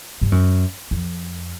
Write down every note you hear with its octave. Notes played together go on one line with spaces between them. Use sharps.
G2
F#2
F2